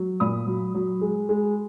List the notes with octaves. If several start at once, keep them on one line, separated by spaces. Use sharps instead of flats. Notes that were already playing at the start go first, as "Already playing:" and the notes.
Already playing: F#3
A#2 B5 D#6
F#3
F#3
G#3
G#3